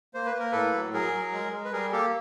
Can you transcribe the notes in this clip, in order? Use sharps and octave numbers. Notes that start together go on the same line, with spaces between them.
A#3 C5
B4
A#3
A#4
A2 A4 B4
F#3
F#3 G#4 A#4
F#3
G#3
G#3
B4
G3 G#4 A#4
A#3 G4 A4